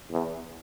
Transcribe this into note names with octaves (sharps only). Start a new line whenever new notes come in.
E2